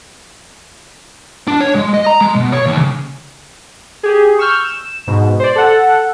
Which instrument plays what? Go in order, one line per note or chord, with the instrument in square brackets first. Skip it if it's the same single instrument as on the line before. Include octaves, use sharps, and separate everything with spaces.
[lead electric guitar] D4
C#5
G#3
D#5
A#5
G#3
B2
C#5
D#2
C#3
[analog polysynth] G4 G#4
C#6 E6 F6 G6
E7
G#2 B2
C5 D5
A4 F#5